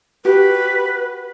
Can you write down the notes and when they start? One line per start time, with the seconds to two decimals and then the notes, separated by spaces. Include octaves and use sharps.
0.25 F#4 G4 B4